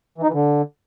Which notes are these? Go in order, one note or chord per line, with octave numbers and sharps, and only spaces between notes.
E3
D#4
E3
D3